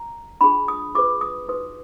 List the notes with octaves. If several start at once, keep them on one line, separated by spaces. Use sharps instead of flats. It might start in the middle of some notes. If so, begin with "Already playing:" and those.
Already playing: A#5
D4 F4 G#4 B5
D#6
F4 G#4 B4 D6
D#6
D#4 F#4 B4 D#6